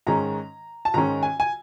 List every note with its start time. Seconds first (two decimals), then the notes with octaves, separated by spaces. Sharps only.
0.07 G#2 D#3 G#3 C#4 A#5
0.85 A5
0.94 G#2 D#3 G#3 C#4 A#5
1.23 G#5
1.40 G#5